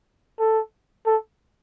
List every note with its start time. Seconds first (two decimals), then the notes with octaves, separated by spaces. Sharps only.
0.39 A4
1.06 A4